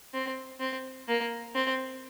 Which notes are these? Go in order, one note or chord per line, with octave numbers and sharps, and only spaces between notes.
C4
C4
A#3
C4